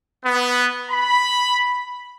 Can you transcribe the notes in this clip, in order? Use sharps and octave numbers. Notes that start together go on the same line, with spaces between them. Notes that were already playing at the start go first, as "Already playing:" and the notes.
B3
B5